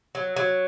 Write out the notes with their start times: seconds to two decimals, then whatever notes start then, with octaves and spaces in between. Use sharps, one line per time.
0.15 F#3
0.36 F#3